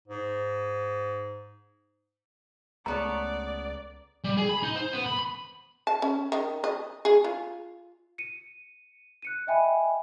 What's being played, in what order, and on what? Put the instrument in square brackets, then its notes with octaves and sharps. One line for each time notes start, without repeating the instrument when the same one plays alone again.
[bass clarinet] G#2
[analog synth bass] C#2 [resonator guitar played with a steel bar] A3 B3 C#5 [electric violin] D5 [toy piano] A#5
[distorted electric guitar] G3
G#4
B5
D#4
C5
B3
B5
[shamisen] A5
C#4
D#3
D#5
G#4
F4
[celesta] C#7 D#7
F#6 C#7 D#7
D#5 E5 G5 G#5 B5